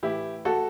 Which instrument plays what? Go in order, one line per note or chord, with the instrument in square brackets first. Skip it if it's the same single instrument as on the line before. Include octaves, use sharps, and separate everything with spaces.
[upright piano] A2 E3 E4 G4
F#4 A4